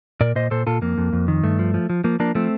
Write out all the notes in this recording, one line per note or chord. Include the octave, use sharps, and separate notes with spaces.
A#2 A#4 D5
A#2 C5 D#5
A#2 A4 C5
A#2 F4 A4
F2 A#3
F2
F2
D#3
G2 A3
F3
F3
F3
F3 A#3
F3 A#3 D4
F3 A3 C4